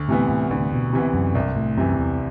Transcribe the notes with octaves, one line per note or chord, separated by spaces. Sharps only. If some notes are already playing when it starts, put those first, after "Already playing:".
Already playing: D2
A2 C3 E3 B3
A2
D2 A2
B2
C3 E3 B3
F#2
C2 G2
A2
F#2 C3 E3
E2